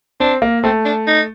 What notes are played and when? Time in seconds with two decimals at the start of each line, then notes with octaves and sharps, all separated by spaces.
0.20 C4 D4
0.42 A#3
0.63 A3 C4
0.85 D4
1.07 D#4